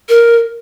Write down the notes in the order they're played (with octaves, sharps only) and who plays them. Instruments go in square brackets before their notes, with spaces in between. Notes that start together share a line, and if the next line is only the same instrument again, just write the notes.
[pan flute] A#4